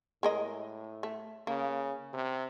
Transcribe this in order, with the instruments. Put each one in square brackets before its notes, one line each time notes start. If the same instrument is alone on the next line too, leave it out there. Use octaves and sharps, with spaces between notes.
[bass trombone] A2 [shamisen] G#3 A#4 D#5
[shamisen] A3
[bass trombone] C#3 [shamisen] A#3
[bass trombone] C3